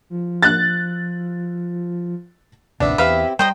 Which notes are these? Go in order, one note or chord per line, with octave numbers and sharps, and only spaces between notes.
F3
F#6 A6
A1 D#2 C3 B3 D4 E5
E2 C4 E4 G4 B4 E5 F5
G3 C5 D#5 G5 A#5